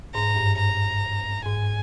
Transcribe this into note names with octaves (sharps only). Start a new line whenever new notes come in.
G#2 A#5
G2
A#5
G#2 G#5